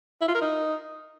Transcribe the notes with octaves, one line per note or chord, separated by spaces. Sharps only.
E4
F4
A#4
D#4